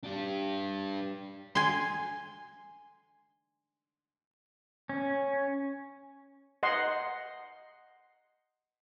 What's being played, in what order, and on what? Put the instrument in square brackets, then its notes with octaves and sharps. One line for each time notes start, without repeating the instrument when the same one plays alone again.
[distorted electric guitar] D4 G4
[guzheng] G#5 C6
[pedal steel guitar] C#4
[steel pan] D#5 F#5 C6